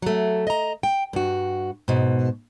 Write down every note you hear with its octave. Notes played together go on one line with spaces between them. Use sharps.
F#3 A3
D#5 A#5
G5
G2 F#4
G#2 B2